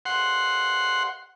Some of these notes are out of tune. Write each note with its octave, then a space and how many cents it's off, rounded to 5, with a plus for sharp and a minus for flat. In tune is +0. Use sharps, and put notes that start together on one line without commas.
F#5 +0 C6 +0